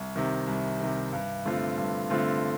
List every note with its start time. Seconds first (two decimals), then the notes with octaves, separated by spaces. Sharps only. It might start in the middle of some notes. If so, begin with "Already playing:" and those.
Already playing: C2
0.16 C3 D#3
0.47 C2
0.80 C3 D#3
1.13 G2
1.45 D3 A3 C4 F4
1.78 G2
2.10 D3 A3 C4 F4